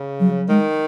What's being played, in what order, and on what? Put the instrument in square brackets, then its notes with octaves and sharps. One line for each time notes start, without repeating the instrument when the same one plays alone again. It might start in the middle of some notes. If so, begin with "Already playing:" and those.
Already playing: [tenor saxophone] C#3
[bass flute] F#3
[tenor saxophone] D#3 [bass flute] G#3